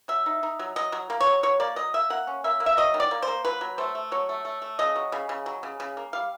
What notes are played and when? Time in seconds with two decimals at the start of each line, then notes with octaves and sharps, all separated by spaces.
0.08 F#3 E5
0.26 D#4
0.43 D#4
0.59 F#3
0.76 F#3 D#5
0.92 F#3
1.10 A#3
1.20 C#5
1.26 F#3
1.43 F#3 C#5
1.60 A#3 D5
1.76 F#3 D#5
1.94 A#3 E5
2.10 A#3 F#5
2.27 C#4
2.44 A#3 E5
2.60 A#3
2.66 E5
2.77 F#3 D#5
2.94 D#3
3.00 D5
3.11 A#3
3.22 C5
3.28 A#3
3.45 F#3 B4
3.61 F#3
3.78 A3 C5
3.95 A3
4.12 F#3 C#5
4.29 A3
4.45 A3
4.62 A3
4.79 C#3 D#5
4.96 F#3
5.12 C#3
5.29 C#3
5.46 F#3
5.63 C#3
5.80 C#3
5.97 A#3
6.13 G3 F5